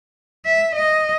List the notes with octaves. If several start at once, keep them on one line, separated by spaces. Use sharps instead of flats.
E5
D#5